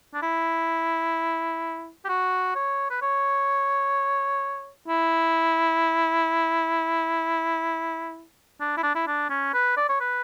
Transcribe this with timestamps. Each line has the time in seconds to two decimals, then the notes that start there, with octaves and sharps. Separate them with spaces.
0.14 D4
0.23 E4
2.05 G4
2.09 F#4
2.56 C#5
2.91 B4
3.02 C#5
4.88 E4
8.61 D4
8.78 E4
8.83 D4
8.95 E4
9.07 D4
9.30 C#4
9.54 B4
9.77 D5
9.89 C#5
10.01 B4